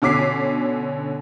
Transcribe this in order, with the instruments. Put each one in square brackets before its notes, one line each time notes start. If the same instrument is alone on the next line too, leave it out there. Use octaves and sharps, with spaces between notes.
[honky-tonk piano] B2 D3 C#4 D6 B6 C7